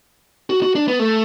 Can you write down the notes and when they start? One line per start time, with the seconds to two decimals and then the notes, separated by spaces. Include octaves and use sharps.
0.50 F#4
0.63 F#4
0.75 D4
0.88 B3
0.99 A3